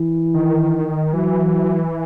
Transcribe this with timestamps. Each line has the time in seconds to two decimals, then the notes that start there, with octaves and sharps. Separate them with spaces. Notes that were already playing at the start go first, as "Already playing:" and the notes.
Already playing: E3
0.34 D#3
1.13 E3 F#3